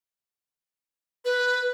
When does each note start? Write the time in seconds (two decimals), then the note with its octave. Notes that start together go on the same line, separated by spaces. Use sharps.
1.25 B4